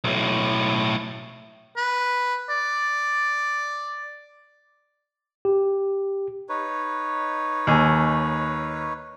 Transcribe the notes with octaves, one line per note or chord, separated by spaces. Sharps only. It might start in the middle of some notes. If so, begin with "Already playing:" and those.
B1 A2
B4
D5
G4
D#4 B4 C#5
D#2 G#5